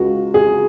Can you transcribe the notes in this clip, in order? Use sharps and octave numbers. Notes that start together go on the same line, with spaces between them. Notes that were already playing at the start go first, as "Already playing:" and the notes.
Already playing: C#2 C#3 G#3 F#4
G#4